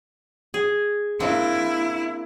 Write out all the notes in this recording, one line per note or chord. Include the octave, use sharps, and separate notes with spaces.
G#4
A#3 C4 D4 E4